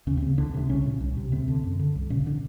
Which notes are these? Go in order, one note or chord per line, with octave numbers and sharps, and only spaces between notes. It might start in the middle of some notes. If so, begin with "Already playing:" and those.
D#2 C#3 C#4
C3 C4
C#3
C#2 D3 D4
C3 D4
C2 C#3 C#4
A#2
C2
C3
D2 C3 C4
D3
F#2
D3
C2
A#2 C#3 C#4
D3 D4